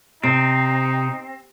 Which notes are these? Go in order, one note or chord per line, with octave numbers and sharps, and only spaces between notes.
C3 C4 D#4